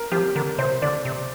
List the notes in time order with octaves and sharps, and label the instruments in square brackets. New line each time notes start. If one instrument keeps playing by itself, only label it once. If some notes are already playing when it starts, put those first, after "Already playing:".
Already playing: [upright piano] A#4
[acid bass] F3 [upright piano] G4
[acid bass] D3 [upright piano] A#4
[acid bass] C3 [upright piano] C5
[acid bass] D3 [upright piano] D5
[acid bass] C3